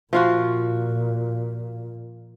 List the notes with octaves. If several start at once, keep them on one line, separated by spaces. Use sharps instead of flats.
A#2 F3 F4 F#4